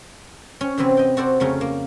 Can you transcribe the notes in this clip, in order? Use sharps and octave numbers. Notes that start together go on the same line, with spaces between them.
C#4
C3 E3 F#3 C4 B4
D#5 G5
F#4 A4 C5 D5
F2 C#3 A3 C#4 A#4
A#3